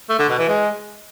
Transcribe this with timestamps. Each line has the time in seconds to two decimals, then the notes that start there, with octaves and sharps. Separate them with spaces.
0.10 A3
0.19 D3
0.29 B2
0.39 E3
0.49 G#3